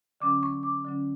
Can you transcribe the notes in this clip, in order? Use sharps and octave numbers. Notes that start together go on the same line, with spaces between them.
D3 F#3 C#4 D6
C#6
D6
D3 F#3 C#4